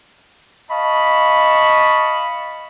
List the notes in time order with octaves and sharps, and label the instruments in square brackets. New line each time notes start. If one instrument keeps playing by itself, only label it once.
[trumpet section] D#5 F5 A5 B5 C#6